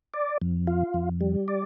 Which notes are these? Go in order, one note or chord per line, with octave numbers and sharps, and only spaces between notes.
D5
F2
F4
F2
G3
D5